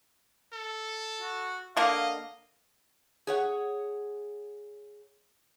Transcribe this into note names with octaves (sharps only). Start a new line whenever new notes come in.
A4
F#4
D3 A#3 D#5 F5
G#4 C#5 F#5